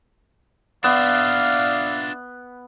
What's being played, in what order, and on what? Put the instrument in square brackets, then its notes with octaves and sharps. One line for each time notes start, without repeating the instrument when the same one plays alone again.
[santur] B3 [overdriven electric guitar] D4 F4 [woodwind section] D5 E5 [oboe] F5